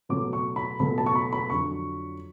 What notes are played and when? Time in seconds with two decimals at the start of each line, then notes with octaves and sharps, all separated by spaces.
0.09 C#2 B2 F#3 A3 D6
0.33 C#6
0.56 B5
0.79 C#2 B2 F#3 A3 B5
0.98 A5
1.06 C#6
1.15 B5
1.33 B5
1.49 F2 D3 F#3 C#6